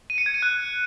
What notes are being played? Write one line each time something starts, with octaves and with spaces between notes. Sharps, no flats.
D#7
C#7
G#6
D#7
F#6